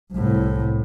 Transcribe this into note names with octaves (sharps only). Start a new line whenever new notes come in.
C2 A2